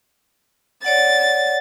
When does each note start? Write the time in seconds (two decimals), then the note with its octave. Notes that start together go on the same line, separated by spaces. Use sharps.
0.84 C#5 D5 F#5 A6